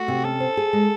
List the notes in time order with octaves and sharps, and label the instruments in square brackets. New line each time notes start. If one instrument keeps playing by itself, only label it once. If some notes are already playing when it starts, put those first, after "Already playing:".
Already playing: [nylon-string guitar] A3 [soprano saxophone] F#4
[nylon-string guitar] C3
[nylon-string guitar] C#4 [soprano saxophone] A4
[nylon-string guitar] C5
G#4
G#3